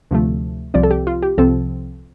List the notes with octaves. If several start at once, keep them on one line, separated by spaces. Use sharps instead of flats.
D2 C3 F3 A3
C2 C3 F3 C4 D5
A4
G4
F4
G4
C2 C3 F3 C4 A4